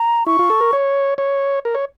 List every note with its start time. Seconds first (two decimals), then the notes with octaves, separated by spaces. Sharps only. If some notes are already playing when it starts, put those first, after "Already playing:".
Already playing: A#5
0.26 E4 C#6
0.39 F4
0.50 A4
0.61 A#4
0.73 C#5
1.18 C#5
1.65 A#4
1.75 C#5